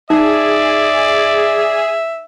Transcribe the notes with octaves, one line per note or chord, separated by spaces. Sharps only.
D#4 G#4 D5 E5